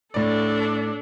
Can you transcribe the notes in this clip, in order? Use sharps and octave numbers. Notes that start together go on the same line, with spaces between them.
A2 D4 A4 D5